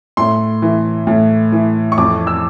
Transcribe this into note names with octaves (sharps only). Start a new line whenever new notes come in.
A2 C6
E3
A2
E3
C#6
F2 D6
E6